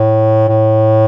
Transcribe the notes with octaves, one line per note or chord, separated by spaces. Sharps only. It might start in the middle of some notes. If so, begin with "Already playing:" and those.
Already playing: A2
A2